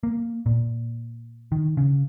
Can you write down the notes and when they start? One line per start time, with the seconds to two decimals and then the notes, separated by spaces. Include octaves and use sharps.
0.03 A#3
0.46 A#2
1.52 D#3
1.77 C#3